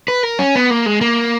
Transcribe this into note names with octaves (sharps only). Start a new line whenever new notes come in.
B4
A#4
C#4
B3
A#3
G#3
A#3